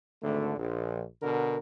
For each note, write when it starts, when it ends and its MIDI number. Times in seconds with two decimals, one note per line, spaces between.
0.22 0.56 32
0.22 0.56 38
0.22 0.56 50
0.22 0.56 57
0.58 1.03 34
1.22 1.57 47
1.22 1.57 50
1.22 1.57 70